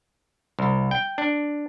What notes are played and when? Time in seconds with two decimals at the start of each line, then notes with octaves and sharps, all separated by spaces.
0.59 C2
0.91 G5
1.18 D4